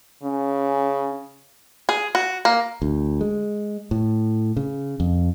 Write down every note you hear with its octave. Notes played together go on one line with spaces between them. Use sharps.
C#3 C#4
G#4
F#4
A#3
D2
G#3
A2
C#3
F2